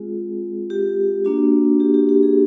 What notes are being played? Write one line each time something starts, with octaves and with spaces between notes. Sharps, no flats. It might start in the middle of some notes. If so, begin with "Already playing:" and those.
Already playing: G#3 C4 F4 G#4
G4
A#3 D4 F#4
G4
G4
G4
G#4